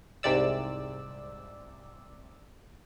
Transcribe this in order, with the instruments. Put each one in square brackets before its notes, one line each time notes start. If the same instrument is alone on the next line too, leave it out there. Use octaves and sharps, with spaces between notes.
[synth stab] C2 G#2 C3 D5 E6